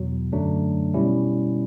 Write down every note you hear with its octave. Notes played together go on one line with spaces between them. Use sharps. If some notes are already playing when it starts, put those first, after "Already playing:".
Already playing: E2 B2 F#3
F#2 D3 F#3 A3 D4
B2 G3 C#4 E4